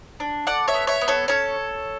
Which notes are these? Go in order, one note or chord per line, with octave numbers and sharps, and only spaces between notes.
D4
A4 D5 F#5
C#5 E5
B3
C#5 E5
B3
A4 C#5
C#4 A4 C#5